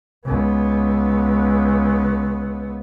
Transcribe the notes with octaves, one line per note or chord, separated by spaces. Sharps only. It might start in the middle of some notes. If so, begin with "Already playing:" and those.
C#2 B3